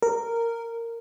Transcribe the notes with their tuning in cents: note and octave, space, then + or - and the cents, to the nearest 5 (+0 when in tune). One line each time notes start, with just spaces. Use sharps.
A#4 -10